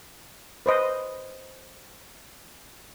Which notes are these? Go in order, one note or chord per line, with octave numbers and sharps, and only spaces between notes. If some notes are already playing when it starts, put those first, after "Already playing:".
B4 C5 D#5